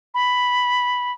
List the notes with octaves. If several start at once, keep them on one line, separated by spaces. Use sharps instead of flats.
B5